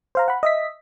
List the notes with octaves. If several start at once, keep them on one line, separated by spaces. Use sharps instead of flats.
C5 F5 A#5
F#5 B5
D#5 E5 B6